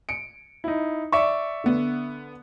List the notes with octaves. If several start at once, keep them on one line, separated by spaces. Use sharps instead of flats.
C#7 D7
D#4 E4
D5 E5 C#6
D3 B3